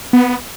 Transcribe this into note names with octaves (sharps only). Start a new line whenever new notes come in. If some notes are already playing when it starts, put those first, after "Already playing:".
B3